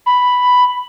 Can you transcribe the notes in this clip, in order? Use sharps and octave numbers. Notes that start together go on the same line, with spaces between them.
B5